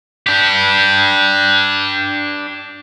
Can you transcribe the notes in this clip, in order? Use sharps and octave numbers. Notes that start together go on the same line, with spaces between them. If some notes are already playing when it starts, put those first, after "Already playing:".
D4 G4